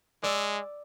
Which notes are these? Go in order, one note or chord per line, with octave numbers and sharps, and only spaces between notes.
G#3 D5 E6